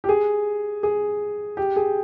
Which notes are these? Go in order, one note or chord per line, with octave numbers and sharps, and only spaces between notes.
G4
G#4
G#4
G4
G#4